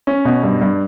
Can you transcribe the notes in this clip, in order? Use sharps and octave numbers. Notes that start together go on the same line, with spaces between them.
C#4
B2
G2
G2